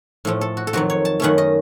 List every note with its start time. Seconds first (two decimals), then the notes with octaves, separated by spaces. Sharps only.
0.25 A2 F3 A3
0.41 A4
0.57 F#4
0.67 A4
0.73 F2 D#3 F#3 F#4
0.90 C#5
1.05 A5
1.20 F#2 D#3 A3 C#4 F#5
1.38 D#5